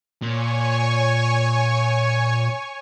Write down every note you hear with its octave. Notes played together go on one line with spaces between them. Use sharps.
A#2 C#5 G#5 C#6